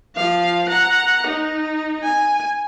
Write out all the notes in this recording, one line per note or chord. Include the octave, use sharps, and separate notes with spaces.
F3 F5
F#5 A#5
D#4
G#5